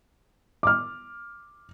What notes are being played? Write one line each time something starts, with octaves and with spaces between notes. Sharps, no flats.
D6 F6